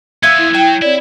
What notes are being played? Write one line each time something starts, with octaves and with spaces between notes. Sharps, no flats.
F3 B3 F4 E5 G#6
E4
F#3 G5
C4 E4 C#5 D5